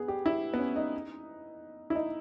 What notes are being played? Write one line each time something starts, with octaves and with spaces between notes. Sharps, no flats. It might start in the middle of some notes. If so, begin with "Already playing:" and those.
Already playing: B3 G#4
G4
E4
B3
C#4
D#4
E4
D#4